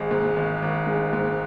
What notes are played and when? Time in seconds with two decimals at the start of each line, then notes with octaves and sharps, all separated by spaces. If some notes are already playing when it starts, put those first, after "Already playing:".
Already playing: G#1 G#3
0.11 G#2
0.36 G#1
0.62 G#1
0.87 G#3
1.13 G#2